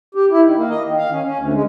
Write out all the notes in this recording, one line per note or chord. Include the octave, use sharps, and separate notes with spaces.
G4
E4
D#3
A#3
D#5
D#3
F5
C#4
C#4
D2
G#3